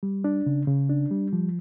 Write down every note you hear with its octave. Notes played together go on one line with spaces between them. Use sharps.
G3
D4
C#3
C#3
D4
G3
F3